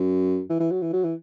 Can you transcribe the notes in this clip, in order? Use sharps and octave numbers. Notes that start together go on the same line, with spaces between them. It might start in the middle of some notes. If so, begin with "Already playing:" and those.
Already playing: F#2
E3
E3
F#3
E3
F#3
E3